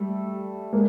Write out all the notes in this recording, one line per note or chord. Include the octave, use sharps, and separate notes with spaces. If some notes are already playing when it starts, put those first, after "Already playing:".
Already playing: G3 A3
G#3 A#3